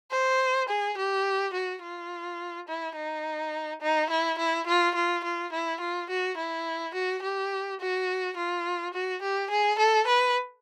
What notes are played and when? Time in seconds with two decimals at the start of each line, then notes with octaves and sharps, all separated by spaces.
0.11 C5
0.69 G#4
0.97 G4
1.53 F#4
1.83 F4
2.68 E4
2.96 D#4
3.81 D#4
4.10 E4
4.38 E4
4.67 F4
4.95 F4
5.24 F4
5.52 E4
5.80 F4
6.09 F#4
6.37 E4
6.94 F#4
7.23 G4
7.80 F#4
8.37 F4
8.93 F#4
9.22 G4
9.50 G#4
9.79 A4
10.07 B4